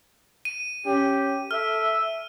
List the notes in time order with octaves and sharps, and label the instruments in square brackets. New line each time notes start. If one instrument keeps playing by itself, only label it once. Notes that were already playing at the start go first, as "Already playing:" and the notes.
[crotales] D#7
[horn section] C#4 G4
[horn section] A4 E5 [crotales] F6